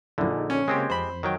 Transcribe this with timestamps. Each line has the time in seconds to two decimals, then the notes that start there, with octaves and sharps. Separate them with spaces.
0.18 A#1 F#2 D3 E4
0.30 D#4 G#4
0.50 C#4
0.68 C#3 G#3 A#3 C4 G4 G#6
0.90 F2 C5 B5
1.23 D#3 F#3 G5